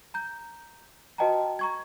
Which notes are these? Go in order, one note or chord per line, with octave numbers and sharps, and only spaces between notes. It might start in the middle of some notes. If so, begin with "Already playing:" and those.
A#5 G6
F#4 B4 D#5 G5 A5 A#5
A#5 C#6 G#6